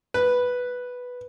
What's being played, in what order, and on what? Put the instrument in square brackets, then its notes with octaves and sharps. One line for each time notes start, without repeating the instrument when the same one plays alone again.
[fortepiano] B4